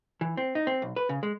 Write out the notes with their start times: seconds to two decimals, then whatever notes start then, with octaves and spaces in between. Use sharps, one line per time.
0.21 E3
0.37 C4
0.55 D#4
0.67 C4
0.82 B1
0.96 B4
1.09 C#3
1.23 G#3